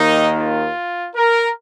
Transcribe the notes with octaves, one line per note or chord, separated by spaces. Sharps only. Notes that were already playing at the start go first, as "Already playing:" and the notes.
Already playing: D#2 D#3 A#3 D#4
F4
A#4